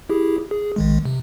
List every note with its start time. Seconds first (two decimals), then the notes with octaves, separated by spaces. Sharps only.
0.10 E4 G4 G#4
0.51 G#4
0.76 A#1 D#3 G#3
1.05 C3